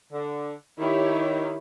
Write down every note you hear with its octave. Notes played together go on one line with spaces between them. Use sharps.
D3
D#3 E4 G4 C#5